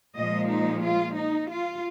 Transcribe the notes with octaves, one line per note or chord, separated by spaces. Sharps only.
A#2 F3 G#3 D#5
D#4
F4
D#4
F4